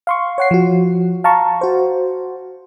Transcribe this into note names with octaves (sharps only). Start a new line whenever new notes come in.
F5 C6 C#6
C#5 F#5 C7
F3 F#4
F5 A5 A#5 C#6
F#4 C5